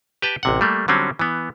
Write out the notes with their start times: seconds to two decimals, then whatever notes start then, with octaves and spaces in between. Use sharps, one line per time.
0.22 G4 B4 G5 A5
0.43 A1 C3 F#5
0.61 G3 A3 A#3
0.88 D3 F#3 G3 C4 C#4
1.19 E3 B3